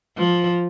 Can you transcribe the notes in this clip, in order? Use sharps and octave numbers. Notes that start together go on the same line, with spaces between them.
F3